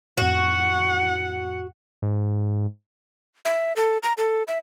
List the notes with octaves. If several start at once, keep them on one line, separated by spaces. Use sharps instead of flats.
F2 A2 F#4 F#5
G#2
E5
A4
A#5
A4
E5